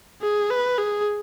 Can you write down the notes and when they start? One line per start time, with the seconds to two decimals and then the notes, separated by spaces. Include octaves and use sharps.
0.22 G#4
0.50 B4
0.78 G#4